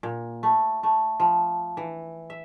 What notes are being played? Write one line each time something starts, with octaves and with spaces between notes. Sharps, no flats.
A#2
A3
A3
F3
E3
E5